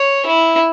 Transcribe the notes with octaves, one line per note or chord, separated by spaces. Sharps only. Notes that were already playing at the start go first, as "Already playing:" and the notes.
Already playing: C#5
E4